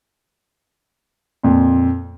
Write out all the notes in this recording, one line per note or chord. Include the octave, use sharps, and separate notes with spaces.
F2 A#2